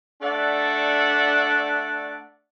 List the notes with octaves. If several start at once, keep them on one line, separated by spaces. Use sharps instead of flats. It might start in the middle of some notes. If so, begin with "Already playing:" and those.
A3 D4 D5 E5 F#5